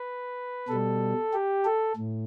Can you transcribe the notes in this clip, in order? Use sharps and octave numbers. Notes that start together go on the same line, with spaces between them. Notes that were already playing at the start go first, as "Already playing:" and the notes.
Already playing: B4
B2 G3 A4
G4
A4
A2